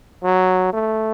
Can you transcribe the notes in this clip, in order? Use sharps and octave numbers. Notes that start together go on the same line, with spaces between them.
F#3
A3